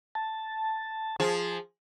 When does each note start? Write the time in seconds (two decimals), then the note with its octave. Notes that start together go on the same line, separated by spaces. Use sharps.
0.15 A5
1.20 F3 G#4